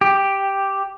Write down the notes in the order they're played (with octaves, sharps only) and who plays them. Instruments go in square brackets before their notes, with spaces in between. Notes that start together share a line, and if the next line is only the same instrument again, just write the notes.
[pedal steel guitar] G4